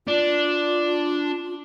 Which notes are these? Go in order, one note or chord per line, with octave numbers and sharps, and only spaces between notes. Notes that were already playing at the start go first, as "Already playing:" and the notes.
D4 F4